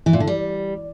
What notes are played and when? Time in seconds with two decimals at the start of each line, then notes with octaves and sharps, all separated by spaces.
0.06 E3
0.13 A#2
0.20 D3
0.27 G3